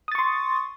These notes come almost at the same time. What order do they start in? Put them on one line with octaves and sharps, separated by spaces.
D#6 A6 C#6 C6